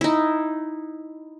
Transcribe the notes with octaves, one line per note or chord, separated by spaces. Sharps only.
D#4 E4